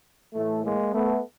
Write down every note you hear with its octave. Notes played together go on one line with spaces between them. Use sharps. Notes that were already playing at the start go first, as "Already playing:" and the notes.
A2 E3 A3
G#3 A#3
A3 B3